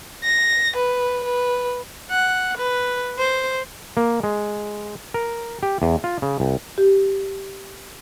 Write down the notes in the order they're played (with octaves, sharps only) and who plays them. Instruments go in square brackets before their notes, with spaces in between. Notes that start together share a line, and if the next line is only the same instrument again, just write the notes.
[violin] A#6
B4
B4
[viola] F#5
B4
C5
[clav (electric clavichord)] A#3
G#3
A#4
G4
E2
F4
C#3
C2
[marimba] G4